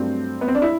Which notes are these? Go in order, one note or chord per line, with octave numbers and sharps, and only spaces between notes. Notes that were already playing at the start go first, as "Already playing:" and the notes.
Already playing: G2 F#3 A3 C4
B3
C4
D4
E4